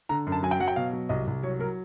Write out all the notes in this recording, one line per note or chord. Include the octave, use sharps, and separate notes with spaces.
D3 A#5
F#2
A5
F#3 G#5
G5
F#3 F#5
G5
B2 F5
F#3
C2 D#5
C2
F#3 C#5
F#3 A#4